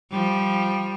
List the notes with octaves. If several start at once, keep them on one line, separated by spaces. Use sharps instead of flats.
F3 G3